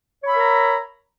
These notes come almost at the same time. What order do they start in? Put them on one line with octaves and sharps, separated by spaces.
C#5 B5 E5 A#4 A#5